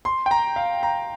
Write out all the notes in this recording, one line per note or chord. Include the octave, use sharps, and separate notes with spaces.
C6
G5
A#5
F5
A#5